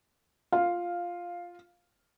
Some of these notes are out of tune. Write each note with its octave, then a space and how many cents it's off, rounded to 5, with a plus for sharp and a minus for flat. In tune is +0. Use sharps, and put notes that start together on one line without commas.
F4 +0 F5 +5